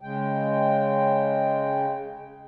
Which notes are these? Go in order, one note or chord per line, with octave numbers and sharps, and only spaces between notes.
C#3 G#3 G5